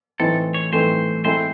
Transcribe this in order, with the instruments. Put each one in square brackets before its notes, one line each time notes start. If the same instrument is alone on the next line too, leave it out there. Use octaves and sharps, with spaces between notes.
[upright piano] A2 E3 A3 C4 D#4 [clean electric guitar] A4
[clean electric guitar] C#5
[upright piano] A2 E3 A3 C4 D#4 [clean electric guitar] C5
[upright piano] G#3 C4 E4 A4 [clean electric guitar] C5